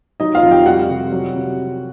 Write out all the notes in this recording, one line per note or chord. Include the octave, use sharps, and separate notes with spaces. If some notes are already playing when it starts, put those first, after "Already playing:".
F#3 D#4 D#5
F4 F5
F2
G4 G5
G3 F#4 F#5
C3
F#3
C3